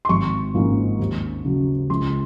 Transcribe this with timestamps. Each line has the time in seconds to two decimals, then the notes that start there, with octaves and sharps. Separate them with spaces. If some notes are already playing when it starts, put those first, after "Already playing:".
0.05 C6
0.09 G#1 C#6
0.54 G#2 F3 A#3 C#4
0.99 D#2
1.45 C#3 F#3
1.90 C#2 C6